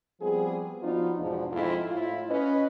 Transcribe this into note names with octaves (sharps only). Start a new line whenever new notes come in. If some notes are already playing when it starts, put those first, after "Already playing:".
F3 G3 B3 C4 G#4
F3 B3 D4 D#4 F4 F#4
E2 G#2 B2 F3 D4
F2 G#2 G#3 E4 F4
A2 E4 F4
C#4 B4 D#5